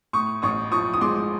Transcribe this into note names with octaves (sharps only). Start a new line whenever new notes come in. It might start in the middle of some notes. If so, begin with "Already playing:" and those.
A2 C#6 D#6
A1 C#6 D#6
F3 C#6 D#6
D#6
G#3 C6 D6